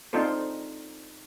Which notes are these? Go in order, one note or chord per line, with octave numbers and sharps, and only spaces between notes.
C4 D4 D#4 F4 A4 C5